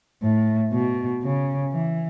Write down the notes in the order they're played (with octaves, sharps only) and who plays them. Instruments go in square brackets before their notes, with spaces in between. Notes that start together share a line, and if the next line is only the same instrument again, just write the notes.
[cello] A2
B2
C#3
E3